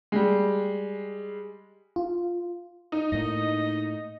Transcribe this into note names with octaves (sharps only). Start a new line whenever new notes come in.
G3 G#3
F4
D#4
A2 A#3 D#5